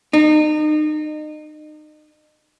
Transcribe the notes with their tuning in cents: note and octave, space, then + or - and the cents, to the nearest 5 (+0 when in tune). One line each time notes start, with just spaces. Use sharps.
D#4 -35